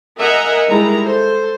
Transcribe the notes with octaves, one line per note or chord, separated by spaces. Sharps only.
A#4 D#5 E5 F#5 G#5 A#5
D#3 G3 G#3 E4 A#5
A4 C5